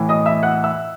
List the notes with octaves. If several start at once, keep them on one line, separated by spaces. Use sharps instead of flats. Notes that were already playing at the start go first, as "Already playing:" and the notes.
Already playing: A2 E3
D#5 D#6
E5 E6
F#5 F#6
E5 E6